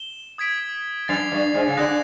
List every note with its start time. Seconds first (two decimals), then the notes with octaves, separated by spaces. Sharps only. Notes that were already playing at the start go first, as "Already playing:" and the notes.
Already playing: E7 G7
0.38 D#6 G#6 B6 D7
1.08 F#2 A6 C7 F7
1.32 G2
1.54 G#2
1.67 C#3
1.77 D3 D#6 F#6 A#6